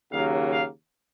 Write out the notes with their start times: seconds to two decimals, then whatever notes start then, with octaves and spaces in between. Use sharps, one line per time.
0.11 D#2 C#3 F#3 A#3 F5
0.50 F5